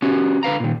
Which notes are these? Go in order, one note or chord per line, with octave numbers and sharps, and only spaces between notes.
C#4 F#4 G4
D3 B4 F5 A#5
A#2 D#3